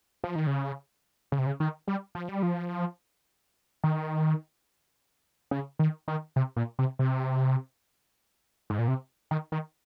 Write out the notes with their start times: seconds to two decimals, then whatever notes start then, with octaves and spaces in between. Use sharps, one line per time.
0.24 F3
0.36 D#3
0.47 C#3
1.32 C#3
1.38 C3
1.46 C#3
1.60 D#3
1.88 G3
2.15 F3
2.29 G3
2.43 F3
3.84 D#3
5.51 C#3
5.79 D#3
6.08 D#3
6.36 C3
6.56 A#2
6.79 C3
6.99 C3
8.70 G#2
8.79 A#2
8.88 C3
9.31 D#3
9.52 D#3